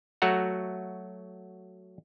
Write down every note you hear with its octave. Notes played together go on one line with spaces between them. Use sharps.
F#3 A3 F#4 F#5 A#5